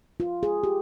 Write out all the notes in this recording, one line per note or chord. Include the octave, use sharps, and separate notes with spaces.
F4
G#4
G4